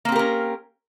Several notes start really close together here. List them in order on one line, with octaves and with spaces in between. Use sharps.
A#3 C4 G4 A#4 C#4